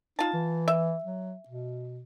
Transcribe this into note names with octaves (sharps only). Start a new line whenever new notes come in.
D#4 F4 A5
E3
E5
F#3
B2